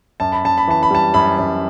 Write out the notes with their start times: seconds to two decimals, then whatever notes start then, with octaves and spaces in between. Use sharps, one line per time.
0.20 F#2 A5
0.32 B5
0.44 F#2 A5
0.58 B5
0.68 E3 A5
0.83 B5
0.91 G3 A5
1.14 F#2 B5
1.38 F#2